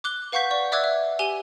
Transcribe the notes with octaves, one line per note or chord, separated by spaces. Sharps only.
D6 F#6 G7
B4 F5 F#5 C#6 G6 B6
D5 C#6
D5 E5 D6 E6 F#6 G#6
E5
G4 G#5 D#7 F7 G7